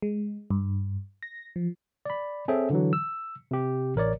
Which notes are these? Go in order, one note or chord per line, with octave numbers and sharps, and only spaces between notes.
G#3
G2
A#6
F3
D5 B5
C4 G#4 A4 C#5 E5 G5
D3 E3 F#3
E6
C3 G4
A1 A#4 C#5 D5